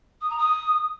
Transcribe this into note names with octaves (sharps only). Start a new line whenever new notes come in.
D#6
A#5
D#6